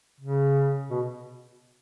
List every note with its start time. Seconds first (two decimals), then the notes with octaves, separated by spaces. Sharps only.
0.20 C#3
0.90 B2